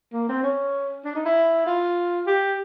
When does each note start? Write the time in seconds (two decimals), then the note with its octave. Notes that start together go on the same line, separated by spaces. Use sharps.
0.13 A#3
0.29 C4
0.43 C#4
1.05 D4
1.15 D#4
1.26 E4
1.66 F4
2.27 G4